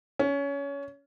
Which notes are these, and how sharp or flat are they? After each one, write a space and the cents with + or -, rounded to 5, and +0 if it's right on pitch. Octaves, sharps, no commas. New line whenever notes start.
C#4 +20